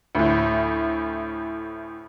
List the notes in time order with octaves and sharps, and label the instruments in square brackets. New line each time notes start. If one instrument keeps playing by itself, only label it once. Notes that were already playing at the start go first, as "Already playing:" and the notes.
[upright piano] D2 A2